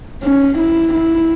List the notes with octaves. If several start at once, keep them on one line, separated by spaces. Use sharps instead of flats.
C#4
E4
E4